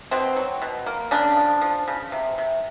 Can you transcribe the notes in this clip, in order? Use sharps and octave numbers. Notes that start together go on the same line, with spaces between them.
B2 C4
F#3
B2
A#3
C#3 D4
F3
F3
C#3
C3
C3